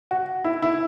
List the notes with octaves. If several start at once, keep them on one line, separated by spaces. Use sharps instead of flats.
F#4
E4
E4